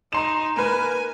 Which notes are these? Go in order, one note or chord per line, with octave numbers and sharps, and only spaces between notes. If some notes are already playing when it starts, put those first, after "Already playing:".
D#4 A#5 C6 E7
A#3 A#4 B4 G#5